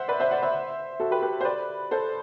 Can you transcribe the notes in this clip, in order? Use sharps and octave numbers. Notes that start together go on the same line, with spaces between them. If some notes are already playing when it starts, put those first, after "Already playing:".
Already playing: C5 E5 F#5
B4 D5
C5 E5
D5 F#5
C5 E5
F#4 A4
G4 B4
G4 B4
C5
B4 D5
A4 C5